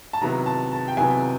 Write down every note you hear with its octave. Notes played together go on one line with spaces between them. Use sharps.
A5
C3 D#3 F#3 B3 E4 A#5
A5
A5
G5
C3 D#3 F#3 B3 E4 G#5